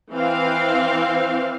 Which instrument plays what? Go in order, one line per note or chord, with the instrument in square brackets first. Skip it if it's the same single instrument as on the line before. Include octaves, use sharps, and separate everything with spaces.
[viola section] E3 C4 F5